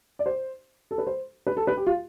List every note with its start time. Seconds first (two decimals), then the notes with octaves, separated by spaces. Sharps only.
0.19 D5
0.26 C5
0.91 A4
0.98 B4
1.07 C5
1.47 B4
1.57 A4
1.67 B4
1.77 G4
1.87 F4